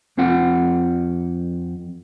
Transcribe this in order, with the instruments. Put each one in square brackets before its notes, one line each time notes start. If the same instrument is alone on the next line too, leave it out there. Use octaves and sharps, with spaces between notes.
[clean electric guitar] F2 C4 F4 F#5